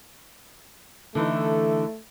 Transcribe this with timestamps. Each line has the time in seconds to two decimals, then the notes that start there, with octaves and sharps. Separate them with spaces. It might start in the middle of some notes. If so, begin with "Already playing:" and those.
1.15 D3 E3 A3 D#4